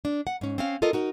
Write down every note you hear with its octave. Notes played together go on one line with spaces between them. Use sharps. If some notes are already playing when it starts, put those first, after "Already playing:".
D4
F#5
G#2 C#4
C4 C#4 F5
F4 A4 A#4 D#5
D#4 F#4 A#4